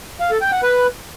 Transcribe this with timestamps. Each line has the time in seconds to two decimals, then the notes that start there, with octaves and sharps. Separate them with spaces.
0.20 F5
0.31 A4
0.41 G5
0.52 F#5
0.63 B4